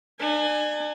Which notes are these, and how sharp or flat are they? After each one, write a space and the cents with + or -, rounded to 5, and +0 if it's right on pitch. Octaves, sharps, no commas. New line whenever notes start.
D4 +40 G#5 +0